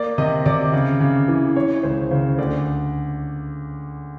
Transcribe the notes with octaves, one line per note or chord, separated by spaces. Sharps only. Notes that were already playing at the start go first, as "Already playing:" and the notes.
Already playing: A#3 D5
C3 D#5
C3 D5
C#3
C#3
E3
E3 C#5
C#2 C5
C#3 C5
D2 D5